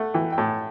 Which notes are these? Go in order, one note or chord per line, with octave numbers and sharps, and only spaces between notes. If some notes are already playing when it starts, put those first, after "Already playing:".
Already playing: A3 E5 F#5
E3 G5
G5
A2 A5